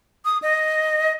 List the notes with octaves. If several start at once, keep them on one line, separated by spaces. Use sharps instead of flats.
D#6
D#5